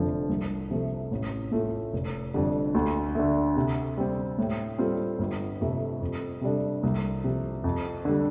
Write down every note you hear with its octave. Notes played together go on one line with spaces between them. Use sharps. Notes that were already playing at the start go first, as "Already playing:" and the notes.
Already playing: F1 F2 D3 F3 A3
C2
C3 F3 A3
A1
A2 A3 F4
F1
F2 D3 G3
D2
D3 A3
C3
G3 C4
A2
G3 C4 F4 A4
G1
F2 C3 A3
F2
C3 G3 D4 A4
C2
C3 F3
F2
D3 G3